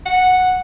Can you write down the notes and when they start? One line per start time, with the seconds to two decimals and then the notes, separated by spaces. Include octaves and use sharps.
0.05 F#5